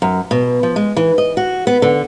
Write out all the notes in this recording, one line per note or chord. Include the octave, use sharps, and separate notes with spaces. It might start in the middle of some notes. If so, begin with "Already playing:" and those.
F#2
B2
F3
G#3
E3
D#5
F#4
B3
D3